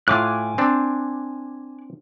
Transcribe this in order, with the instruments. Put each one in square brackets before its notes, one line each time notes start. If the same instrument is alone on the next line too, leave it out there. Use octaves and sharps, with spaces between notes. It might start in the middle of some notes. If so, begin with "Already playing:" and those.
[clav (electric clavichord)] A2 F4 [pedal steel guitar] G#5 D6 F#6
[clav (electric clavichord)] C4 D4